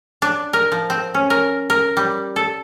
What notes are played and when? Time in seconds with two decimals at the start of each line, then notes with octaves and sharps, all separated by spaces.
0.22 D4
0.53 A#4
0.72 F3
0.90 C4
1.14 C#4
1.30 A#4
1.70 A#4
1.97 G3
2.36 A4